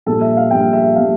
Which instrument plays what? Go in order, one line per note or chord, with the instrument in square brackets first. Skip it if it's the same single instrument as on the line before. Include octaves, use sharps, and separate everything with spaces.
[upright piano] A#1 A#2 G3 A4
E5
F5
A#1 A#2 G3 G5
E5
A#2 G3 F5